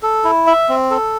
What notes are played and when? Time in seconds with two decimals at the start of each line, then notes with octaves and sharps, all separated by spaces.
0.03 A4
0.24 E4
0.47 E5
0.69 C4
0.91 A4